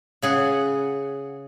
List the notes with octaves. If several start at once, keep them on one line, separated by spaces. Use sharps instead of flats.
C#3 G#4 F#5